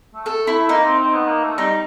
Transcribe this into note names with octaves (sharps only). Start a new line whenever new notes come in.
A3
A4
E4
A#3 D#4
C4
C4
B3
A#3
A3
G3 D#4